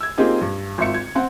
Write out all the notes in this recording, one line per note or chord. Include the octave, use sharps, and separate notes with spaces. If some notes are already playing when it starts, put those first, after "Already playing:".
E6 G#6
A#3 C4 D#4 F4 G4 G#4
G2
G#1 F4 E5 C#7
G#6
C4 F#5